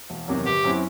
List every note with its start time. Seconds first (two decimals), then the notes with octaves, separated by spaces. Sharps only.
0.10 E1
0.28 E2 C3 D#3 F#3
0.45 G1 G4
0.64 F#2 F#3 C4 E4